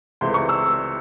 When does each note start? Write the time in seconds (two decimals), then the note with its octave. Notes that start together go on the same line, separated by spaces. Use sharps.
0.21 C#2 C3 E3 A3 C6
0.34 C#6
0.49 E6